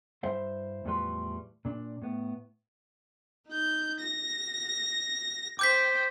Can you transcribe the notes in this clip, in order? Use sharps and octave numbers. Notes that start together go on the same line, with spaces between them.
G2 G3 E4 C5 E5 F5
E2 A2 F3 G3 B4 C6
A#2 D4
A2 B3
D#4 G6
A#6
C5 G5 D6 G6 B6